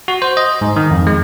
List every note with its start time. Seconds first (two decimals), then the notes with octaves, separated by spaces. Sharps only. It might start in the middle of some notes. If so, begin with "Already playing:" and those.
0.08 F#4
0.22 C5
0.37 D#5
0.61 G#2
0.76 D#3
0.91 F2
1.07 G#3